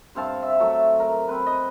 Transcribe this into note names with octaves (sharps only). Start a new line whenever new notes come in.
G2 C4 F5 A5
E5
F#3 A3 E5
A#4
C4 B4
D#5